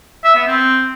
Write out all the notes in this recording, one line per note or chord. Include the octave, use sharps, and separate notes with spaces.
E5
B3
C4